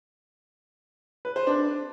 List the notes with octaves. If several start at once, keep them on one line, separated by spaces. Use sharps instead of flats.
B4
C5
D4